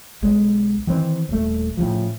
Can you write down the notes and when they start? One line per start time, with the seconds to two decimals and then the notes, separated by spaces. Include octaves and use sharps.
0.23 B1 G#3
0.87 D#3 E3 C4
1.29 D#1 A3
1.77 A2 C#3 F3